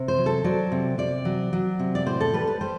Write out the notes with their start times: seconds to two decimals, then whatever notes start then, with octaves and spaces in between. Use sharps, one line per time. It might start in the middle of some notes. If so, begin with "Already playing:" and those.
Already playing: C3
0.08 C5
0.18 F#3
0.26 A4
0.44 F#3 D5
0.72 C3
0.98 C3 D5
1.25 F#3
1.53 F#3
1.79 C3
1.95 D5
2.06 A2 C5
2.21 A4
2.34 G3 B4
2.47 B4
2.61 G3 C5